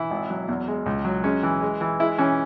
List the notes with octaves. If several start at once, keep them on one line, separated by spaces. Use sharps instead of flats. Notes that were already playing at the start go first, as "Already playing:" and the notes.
Already playing: E3 E4
G#1
F#3
E2
G#3
C#2
F#3
G#3 C#4
E3
G#3
E3
G#3 E4
E3 C#4